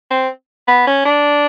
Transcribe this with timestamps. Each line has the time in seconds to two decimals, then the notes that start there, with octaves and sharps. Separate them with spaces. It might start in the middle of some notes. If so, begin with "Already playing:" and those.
0.11 C4
0.68 B3
0.87 C#4
1.05 D4